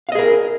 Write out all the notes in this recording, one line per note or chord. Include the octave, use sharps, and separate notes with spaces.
G#4 A#4 D#5 F5